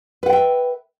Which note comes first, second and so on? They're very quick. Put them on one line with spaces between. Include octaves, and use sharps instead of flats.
B4 F#5 G5 E5